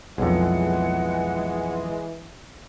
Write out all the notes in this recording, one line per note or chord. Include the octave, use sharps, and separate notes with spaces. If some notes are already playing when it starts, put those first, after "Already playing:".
B1 F2 E3 G#3 F#5